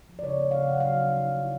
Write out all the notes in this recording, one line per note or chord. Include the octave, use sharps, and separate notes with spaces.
F3
D5
C#3 C#5
A#3
C#3 F5
C#3 F#5
F#3 F5
D#4
D#4
D#4
E4